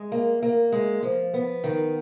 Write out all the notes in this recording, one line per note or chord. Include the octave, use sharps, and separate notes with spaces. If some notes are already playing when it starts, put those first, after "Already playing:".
Already playing: G#3
A#3
A#3
G#3
F3
B3
D#3